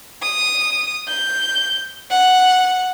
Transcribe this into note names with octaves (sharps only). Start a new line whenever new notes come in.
D#6
G6
F#5